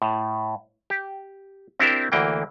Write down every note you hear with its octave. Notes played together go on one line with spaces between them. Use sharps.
A2
G4
C4 D4 E4 G4 A#4 C5
D2 E3 A#3 G5